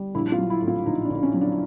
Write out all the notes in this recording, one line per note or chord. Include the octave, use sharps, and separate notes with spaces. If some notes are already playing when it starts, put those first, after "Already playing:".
Already playing: G3
A#1 E4
F4
F#3
E4
A2
F4
A#1 D#4
D4
A#1
C#4
F#3
D4